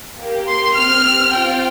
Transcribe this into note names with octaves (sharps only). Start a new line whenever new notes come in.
A#3 G4
C6
C4 G4 F6
C4 F4 G5